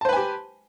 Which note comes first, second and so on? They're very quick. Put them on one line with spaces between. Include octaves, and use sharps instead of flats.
A5 C5 B4 G#5 G4